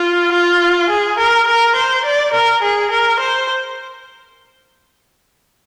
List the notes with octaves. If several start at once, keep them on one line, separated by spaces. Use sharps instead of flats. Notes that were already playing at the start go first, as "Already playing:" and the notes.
Already playing: F4
F4
G#4
A#4
A#4
C5
D5
A#4
G#4
A#4
C5